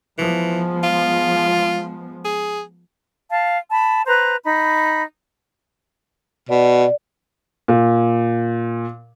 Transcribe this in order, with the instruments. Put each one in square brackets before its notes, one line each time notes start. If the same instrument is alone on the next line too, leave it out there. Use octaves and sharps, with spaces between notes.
[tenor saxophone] E3 [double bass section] F3 G#3 B3
[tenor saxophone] F4
G#4
[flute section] F5 A5
A5 B5
B4 C5 A#5
D#4 B5
[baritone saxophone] B2 [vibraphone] D5
[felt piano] A#2